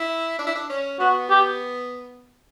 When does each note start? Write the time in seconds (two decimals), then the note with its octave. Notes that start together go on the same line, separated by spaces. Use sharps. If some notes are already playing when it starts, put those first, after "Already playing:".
Already playing: E4
0.39 D4
0.47 E4
0.55 D4
0.70 C#4
1.00 B3 F#4
1.30 G4